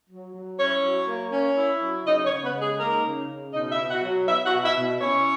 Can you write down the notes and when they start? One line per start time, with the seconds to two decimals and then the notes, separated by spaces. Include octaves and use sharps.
0.08 F#3
0.34 F#3
0.58 C#4 E4 C#5
0.82 F#3
1.07 A#3
1.31 C#4
1.57 E4
1.81 F#3
2.05 C#3 D#4 D#5
2.24 C#4 C#5
2.30 C#3
2.42 B3 B4
2.54 G#3
2.61 G#4
2.79 A#3 D#4 A#4
3.04 C#3
3.28 C#3
3.53 B2 D#4 D#5
3.71 E4 E5
3.78 B2
3.90 F#4 F#5
4.02 F#3
4.27 B3 E4 E5
4.45 F#4 F#5
4.51 B2
4.63 E4 E5
4.76 B2
5.00 C#4 E4 C#5